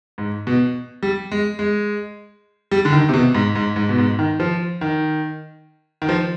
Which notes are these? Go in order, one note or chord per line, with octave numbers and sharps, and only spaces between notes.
G#2
B2
G3
G#3
G#3
G3
D3
D#3
C3
B2
G#2
G#2
G#2
B2
G#2
D#3
F3
D#3
D#3
F3